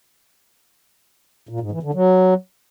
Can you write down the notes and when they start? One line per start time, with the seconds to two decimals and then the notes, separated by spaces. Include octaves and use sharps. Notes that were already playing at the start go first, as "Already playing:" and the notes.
1.49 A#2
1.60 G#2
1.72 E3
1.83 D3
1.94 F#3